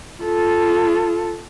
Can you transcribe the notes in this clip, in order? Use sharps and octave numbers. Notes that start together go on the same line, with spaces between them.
F4 A4